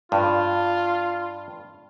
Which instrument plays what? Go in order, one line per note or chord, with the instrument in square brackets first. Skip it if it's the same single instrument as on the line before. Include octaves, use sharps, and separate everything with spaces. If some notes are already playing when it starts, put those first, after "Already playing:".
[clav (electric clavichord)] G2 [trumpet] F4